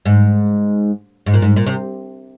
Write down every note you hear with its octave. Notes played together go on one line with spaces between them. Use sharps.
G#2
G#2
A#2
G#2
A#2
C3